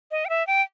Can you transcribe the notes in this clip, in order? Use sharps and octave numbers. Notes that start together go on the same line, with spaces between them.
D#5
G5
E5
G5